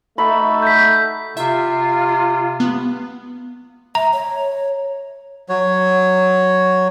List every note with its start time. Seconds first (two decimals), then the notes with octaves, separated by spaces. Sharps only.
0.18 A3 D#4 F#4 A4 B5
0.62 G6 B6
1.37 C3 F4 E5
2.60 B3
3.95 E5 A#5
4.12 C#5
5.49 F#3 C#5